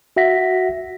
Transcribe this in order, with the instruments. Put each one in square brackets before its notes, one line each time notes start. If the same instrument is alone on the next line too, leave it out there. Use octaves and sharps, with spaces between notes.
[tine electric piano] F#4 E5 F#5 A#6 B6